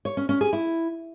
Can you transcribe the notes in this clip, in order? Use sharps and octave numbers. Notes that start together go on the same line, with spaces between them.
C#5
C#4
C#4
G#4
E4